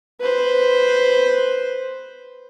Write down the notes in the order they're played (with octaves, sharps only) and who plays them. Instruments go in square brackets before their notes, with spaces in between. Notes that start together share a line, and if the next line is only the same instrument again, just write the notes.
[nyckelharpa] B4 C5